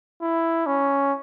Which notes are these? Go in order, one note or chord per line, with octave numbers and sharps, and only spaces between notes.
E4
C#4